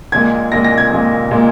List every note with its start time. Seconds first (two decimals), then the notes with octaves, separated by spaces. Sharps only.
0.12 A#1 A#2 G#3 G#6
0.52 A#1 A#2 G#3 A#6
0.64 A#6
0.78 G#6
0.91 A#1 A#2 G#3
1.31 A#2 G#3